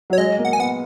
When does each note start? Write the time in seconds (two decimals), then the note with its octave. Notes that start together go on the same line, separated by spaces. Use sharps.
0.10 F#3 C#5
0.18 G#3 D#5
0.39 A#3
0.45 F#5
0.53 G#5
0.59 B3 F#5